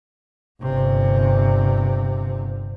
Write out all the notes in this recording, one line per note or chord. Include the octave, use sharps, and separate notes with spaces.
G1 C3